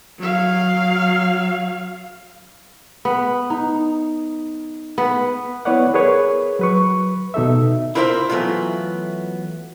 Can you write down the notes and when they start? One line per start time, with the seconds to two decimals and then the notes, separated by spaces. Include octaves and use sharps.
0.18 F#3 F5
3.05 B3
3.50 D#4
4.98 B3
5.65 B3 E4 B4 C#5 D5 F#5
5.94 G#4 A#4 B4 C#5
6.59 F#3 B4 C#6
7.34 B2 D#4 A4 E5
7.95 E4 F4 A#4 C5 C#5 E5
8.29 E3 F#3 A3 B3 F4